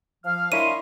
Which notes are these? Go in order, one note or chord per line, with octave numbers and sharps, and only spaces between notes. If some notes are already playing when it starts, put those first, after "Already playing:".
F3 F5 F6
D4 E4 A#4 C#5 D#5 C6 D#7